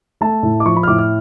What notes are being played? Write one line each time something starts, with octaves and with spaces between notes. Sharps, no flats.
A3 A5
A2
D6
F3 C#6
B5
F6
A2 D6
F6